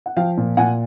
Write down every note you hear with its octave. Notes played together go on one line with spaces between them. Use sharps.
F#5
F3 F5 G5
A#2
A#2 F#5 G#5